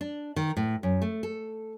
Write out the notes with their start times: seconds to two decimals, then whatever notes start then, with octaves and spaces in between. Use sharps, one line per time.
0.01 D4
0.36 D#3
0.57 A2
0.83 F#2
1.02 A3
1.23 A4